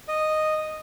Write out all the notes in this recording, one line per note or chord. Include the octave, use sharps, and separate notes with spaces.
D#5